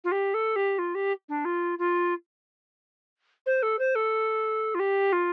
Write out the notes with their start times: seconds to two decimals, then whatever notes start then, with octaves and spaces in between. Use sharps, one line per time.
0.04 F4
0.12 G4
0.34 A4
0.56 G4
0.79 F4
0.95 G4
1.29 D4
1.45 F4
1.79 F4
3.46 C5
3.63 A4
3.79 C5
3.95 A4
4.75 F4
4.79 G4
5.12 F4